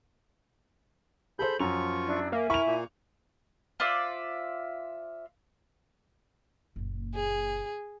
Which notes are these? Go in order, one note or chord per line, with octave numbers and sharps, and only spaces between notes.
G#4 A4 C5 B5 G6
F#2 F3 F4 C#6 F7
D4 E4
A#3 E5 G#5
E4 A#4 C#6 F7
A#2 A#3
F4 C5 D5 E5
F#1 A#2
G#4